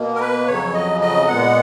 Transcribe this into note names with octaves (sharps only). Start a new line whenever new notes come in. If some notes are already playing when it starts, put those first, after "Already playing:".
Already playing: B2 A#3
A#4
B4
F2 C#3 F#3 C#5
D#5
D#5
A#2 G#3 B3 F#5